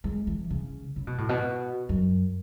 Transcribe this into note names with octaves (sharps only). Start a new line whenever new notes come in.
G#3
E3
C#3
C#3
B2
A2
B2
F#2